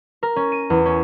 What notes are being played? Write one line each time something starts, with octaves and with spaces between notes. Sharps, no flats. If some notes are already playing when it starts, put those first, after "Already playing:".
A#4
C#4
D#7
E2
C#4